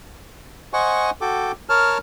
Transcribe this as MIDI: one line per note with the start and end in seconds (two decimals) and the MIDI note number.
0.73 1.10 72
0.73 1.10 75
0.73 1.10 78
0.73 1.10 80
0.73 1.10 85
1.21 1.52 66
1.21 1.52 69
1.21 1.52 79
1.21 1.52 86
1.69 1.98 70
1.69 1.98 73
1.69 1.98 81
1.69 1.98 89